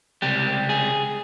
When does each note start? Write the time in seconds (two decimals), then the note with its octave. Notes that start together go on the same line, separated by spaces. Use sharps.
0.22 C#2 C3 G3 G4
0.69 G#4